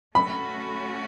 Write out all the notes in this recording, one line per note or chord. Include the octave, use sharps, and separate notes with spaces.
A3 C#4 F#4 B5